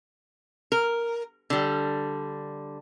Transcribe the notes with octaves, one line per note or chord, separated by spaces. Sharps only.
A#4
D3 G3